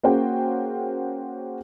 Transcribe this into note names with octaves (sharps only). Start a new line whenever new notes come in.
A#3 C#4 F#4 G#4 C5 G5